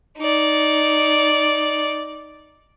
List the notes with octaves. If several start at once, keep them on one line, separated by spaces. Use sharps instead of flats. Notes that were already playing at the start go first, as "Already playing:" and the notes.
D#4 D5